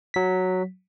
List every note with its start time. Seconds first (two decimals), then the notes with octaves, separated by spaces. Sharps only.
0.14 F#3 B6